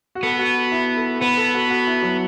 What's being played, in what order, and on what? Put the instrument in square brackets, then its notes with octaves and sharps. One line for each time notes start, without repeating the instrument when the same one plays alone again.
[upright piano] F#4
[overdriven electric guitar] B3 [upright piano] A4
[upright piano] F#4
E4
A4
[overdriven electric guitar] B3 [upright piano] B4
[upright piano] A4
F#4
F#4
E4
F#3